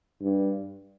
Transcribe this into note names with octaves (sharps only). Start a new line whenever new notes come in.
G2